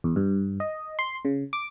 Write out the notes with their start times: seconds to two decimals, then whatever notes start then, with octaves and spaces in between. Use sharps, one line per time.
0.04 E2
0.16 G2
0.60 D#5
0.99 C6
1.25 C#3
1.53 D6